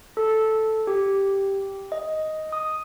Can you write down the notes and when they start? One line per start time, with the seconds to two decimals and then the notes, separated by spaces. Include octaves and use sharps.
0.17 A4
0.87 G4
1.92 D#5
2.52 D#6